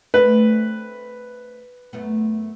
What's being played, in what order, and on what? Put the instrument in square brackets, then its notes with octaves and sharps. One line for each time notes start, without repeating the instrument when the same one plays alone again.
[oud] A3 C4 D4 [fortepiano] B4
[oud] F#2 A3 B3